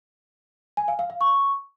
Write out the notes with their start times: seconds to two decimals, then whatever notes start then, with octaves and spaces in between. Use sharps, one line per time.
0.77 G#5
0.88 F5
0.99 F5
1.10 F5
1.21 C#6